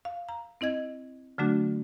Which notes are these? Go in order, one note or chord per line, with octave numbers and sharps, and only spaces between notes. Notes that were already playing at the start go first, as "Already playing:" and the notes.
F5
A#5
C4 E4 D#5 G#6
D3 F#3 A3 D4 F#4